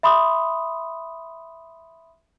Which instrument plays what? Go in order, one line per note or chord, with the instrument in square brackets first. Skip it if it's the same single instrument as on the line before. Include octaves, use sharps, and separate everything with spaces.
[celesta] E5 B5 C6 D#6